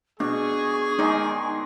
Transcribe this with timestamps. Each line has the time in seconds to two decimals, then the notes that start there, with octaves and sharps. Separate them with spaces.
0.20 B2 D4 G#4 C#6
0.99 D#3 G#3 D#4 D5